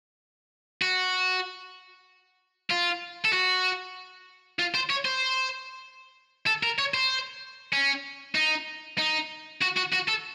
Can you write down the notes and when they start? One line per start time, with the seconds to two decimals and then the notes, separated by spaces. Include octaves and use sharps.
0.82 F#4
2.71 F4
3.25 A4
3.33 F#4
4.59 F4
4.75 C5
4.90 C#5
5.05 C5
6.46 A4
6.63 A#4
6.79 C#5
6.94 C5
7.73 C#4
8.35 D#4
8.98 D#4
9.61 F#4
9.76 F#4
9.93 F#4
10.08 A4